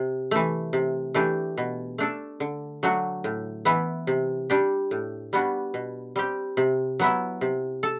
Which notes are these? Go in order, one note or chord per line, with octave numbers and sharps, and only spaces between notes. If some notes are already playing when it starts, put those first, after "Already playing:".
Already playing: C3
E3 A3
C3
E3 A3 D4 G4
B2
A3 D4 A4
D3
F#3 A3 D4 F#4
A2
E3 B3 E4
C3
G3 D4 G4
A2
G3 B3 D4 F#4
B2
G3 C4 G4
C3
F#3 B3 E4
C3
A4